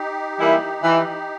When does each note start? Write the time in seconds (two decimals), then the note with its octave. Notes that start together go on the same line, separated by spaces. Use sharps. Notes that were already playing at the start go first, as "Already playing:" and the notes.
Already playing: D#4 G4
0.39 E3 G3 A#3 E4
0.83 E3